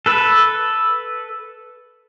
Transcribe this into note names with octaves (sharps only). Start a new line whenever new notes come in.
A4 B4